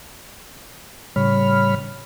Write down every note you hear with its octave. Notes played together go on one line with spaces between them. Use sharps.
A2 C#3 G3 C#5 B5 F6